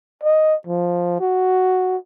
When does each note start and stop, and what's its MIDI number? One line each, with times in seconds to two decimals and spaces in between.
0.24 0.55 75
0.67 1.18 53
1.21 1.97 66